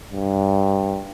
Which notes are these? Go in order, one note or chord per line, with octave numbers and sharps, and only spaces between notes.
G2